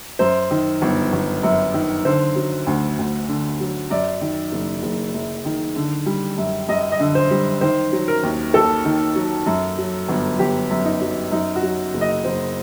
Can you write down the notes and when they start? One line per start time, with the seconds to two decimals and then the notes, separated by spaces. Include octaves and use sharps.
0.19 F#2 C5
0.51 D#3
0.82 G1
1.13 G1
1.43 F#2
1.74 D#3
2.05 D3 C5
2.36 F#3
2.67 D2
2.98 D2
3.28 D3
3.60 F#3
3.91 F#2 D5
4.21 D#3
4.52 F#1
4.83 F#1
5.14 F#2
5.45 D#3
5.76 D3
6.06 G3
6.38 F#2
6.69 F#2 D#5
6.92 D#5
7.00 D3
7.15 C5
7.31 G3
7.61 D#3 C5
7.92 F#3
8.08 A#4
8.23 D#2
8.54 D#2 A4
8.85 D#3
9.15 F#3
9.47 F#2
9.78 F#3
10.09 G1
10.39 G1 G4
10.71 F#2
10.85 D#4
11.01 F#3
11.32 F#2 D#4
11.56 F#4
11.63 F#3
11.94 F#1
12.01 D#5
12.24 F#1 C5